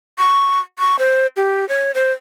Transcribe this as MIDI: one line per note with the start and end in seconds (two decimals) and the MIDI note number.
0.18 0.60 85
0.79 0.99 85
0.99 1.27 72
1.37 1.67 67
1.69 1.92 73
1.95 2.12 72